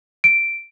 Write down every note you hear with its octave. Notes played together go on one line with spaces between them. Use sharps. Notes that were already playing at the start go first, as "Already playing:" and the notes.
D7